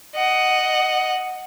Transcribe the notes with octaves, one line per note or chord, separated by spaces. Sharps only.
D#5 F#5